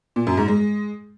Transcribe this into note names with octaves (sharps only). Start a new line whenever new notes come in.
A#2
F#2
G#2
G#3